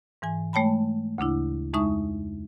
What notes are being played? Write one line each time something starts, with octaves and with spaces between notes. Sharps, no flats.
G#2 E3 G#5
G#3 A3 C#5 G5 A5 B5
D2 C#3 D4 E4
F2 G#3 D#4 E5 C#6 D#6